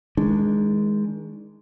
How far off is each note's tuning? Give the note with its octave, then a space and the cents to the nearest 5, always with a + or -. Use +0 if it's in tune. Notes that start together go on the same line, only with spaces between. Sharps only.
D#3 +30 G#3 +0 D4 +0